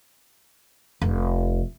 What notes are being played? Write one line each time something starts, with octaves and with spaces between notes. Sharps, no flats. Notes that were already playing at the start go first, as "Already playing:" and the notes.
F1